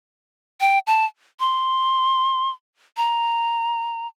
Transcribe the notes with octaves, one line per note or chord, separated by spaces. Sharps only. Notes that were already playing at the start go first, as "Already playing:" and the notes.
G5
A5
C6
A#5